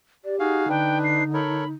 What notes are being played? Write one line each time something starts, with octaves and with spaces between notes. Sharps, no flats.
G4 D5
D#4 F#4 G#4 F5
D3 D4 B4 G5
C7
A4 A#4 C#5 B5